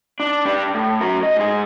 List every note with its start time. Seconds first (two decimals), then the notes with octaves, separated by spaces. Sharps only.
0.20 D4
0.45 G3 D4
0.74 A2
1.01 F#3 A#4
1.23 D#5
1.36 G#2 G#4